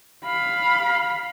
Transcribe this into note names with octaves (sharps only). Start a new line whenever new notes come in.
F5 B5